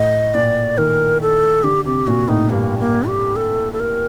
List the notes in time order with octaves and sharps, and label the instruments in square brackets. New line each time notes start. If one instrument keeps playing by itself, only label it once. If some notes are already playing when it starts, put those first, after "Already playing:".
Already playing: [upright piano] A2 [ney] D#5
[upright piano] A#2 [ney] D5
[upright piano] D#3 [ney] A#4
[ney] A4
[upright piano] D3 [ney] G4
[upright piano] C3 [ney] G4
[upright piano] A#2 [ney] F#4
[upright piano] A2 [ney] D#4
[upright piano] G2 [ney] A#3
[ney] A#3
G4
A4
A4
A#4